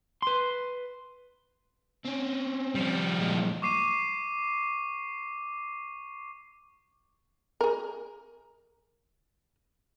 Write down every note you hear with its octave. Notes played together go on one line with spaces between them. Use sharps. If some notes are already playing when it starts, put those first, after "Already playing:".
B4 C6
C4 C#4
F3 G3
A#2 G#3
C#6 D6 C7 D#7
G#4 A#4